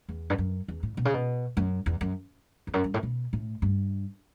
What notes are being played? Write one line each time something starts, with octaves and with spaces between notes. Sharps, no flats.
E2
G2
F#2
E2
A2
B2
C#3
B2
F#2
E2
F#2
E2
F#2
G2
A2
B2
A2
G2